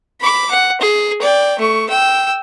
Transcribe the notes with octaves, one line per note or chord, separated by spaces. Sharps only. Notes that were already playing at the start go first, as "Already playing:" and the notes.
B5 D6
F#5
G#4
D5 G5
A3 C#6
G5 E6